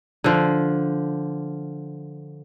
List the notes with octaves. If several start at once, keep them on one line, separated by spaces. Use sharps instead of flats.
D3 F3